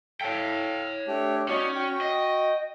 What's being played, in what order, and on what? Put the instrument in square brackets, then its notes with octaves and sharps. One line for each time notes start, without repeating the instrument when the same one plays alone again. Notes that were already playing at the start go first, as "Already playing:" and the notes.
[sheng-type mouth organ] A4 F5 [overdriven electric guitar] C#5 G5
[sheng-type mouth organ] A3 D4 G4
[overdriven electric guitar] C#4 [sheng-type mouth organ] D#4 F#4 D5
[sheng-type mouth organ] F#4 G5
[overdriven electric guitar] D#5